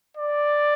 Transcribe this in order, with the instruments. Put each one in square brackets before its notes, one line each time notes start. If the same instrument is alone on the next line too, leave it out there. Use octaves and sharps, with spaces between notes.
[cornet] D5